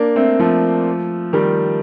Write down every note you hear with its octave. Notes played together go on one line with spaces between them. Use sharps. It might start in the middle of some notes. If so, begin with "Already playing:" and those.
Already playing: A#3 D4
A3 C4
F3 A3
D#3 G3